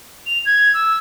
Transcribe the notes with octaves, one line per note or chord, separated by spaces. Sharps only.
F7
G#6
E6